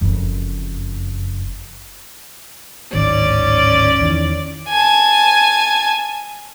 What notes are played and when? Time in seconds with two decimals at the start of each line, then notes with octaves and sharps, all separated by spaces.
0.01 F#1 F2
2.93 D1 G#1 D#3 C#4 D5
4.01 E2 D#3 E3
4.69 G#5 A5